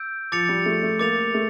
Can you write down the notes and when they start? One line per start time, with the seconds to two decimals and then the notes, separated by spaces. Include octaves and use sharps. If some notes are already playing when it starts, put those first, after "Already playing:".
Already playing: E6 G6 D7
0.32 F3 D6 A6 C#7 F7
0.49 G3
0.66 A3
0.83 A3
0.99 A#3 D6 A6 C#7 F7
1.34 A3